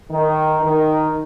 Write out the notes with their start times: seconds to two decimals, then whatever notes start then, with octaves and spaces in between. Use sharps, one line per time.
0.10 D#3
0.63 D#3